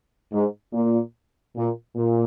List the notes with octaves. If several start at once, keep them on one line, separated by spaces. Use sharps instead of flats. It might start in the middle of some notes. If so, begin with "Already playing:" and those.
G#2
A#2
A#2
A#2